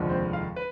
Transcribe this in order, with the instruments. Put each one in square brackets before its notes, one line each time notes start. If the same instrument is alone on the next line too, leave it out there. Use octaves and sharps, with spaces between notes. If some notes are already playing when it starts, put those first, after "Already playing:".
Already playing: [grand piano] F1 D#2 D3 F3 G#3
C4 C5
F4 F5
B4